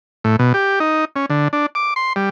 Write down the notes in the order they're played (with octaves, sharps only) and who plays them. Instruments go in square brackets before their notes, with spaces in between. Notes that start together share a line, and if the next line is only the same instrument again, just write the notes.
[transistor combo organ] A2
B2
G4
D#4
C#4
D3
D4
D6
C6
G3